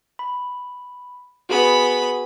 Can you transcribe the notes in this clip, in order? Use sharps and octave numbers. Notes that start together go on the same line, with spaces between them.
B5
B3 F#4 G#4 G#5 B5